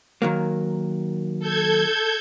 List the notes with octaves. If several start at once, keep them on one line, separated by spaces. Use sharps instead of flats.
D#3 F#3 A#3
A4 G6 G#6